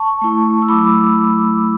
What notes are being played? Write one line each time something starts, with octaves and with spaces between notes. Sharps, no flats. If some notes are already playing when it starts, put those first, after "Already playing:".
Already playing: A5 C#6
A3 E4
E6
F#3 A3 E4 B5 D6